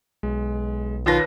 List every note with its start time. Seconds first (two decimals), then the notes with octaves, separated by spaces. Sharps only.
0.23 B1 G#3
1.06 D#2 F4 B4 C#5 A5 A#6